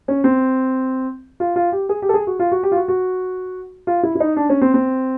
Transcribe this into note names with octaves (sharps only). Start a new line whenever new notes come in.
C#4
C4
F4
F4
G4
G#4
G4
A4
G#4
F#4
F4
F#4
G4
F4
F#4
F#4
F4
E4
E4
D#4
D4
C#4
C4
C4